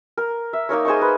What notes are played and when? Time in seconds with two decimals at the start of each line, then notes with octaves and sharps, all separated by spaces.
0.17 A#4
0.53 E5
0.69 A#3 D#4 A#4 C#5
0.85 G#4 C5 D#5 C#6
1.01 B4